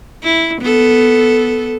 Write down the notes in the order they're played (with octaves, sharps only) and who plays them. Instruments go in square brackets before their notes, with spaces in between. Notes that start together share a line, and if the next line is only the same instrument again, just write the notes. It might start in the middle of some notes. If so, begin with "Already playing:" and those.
[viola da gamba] E4
B3 A4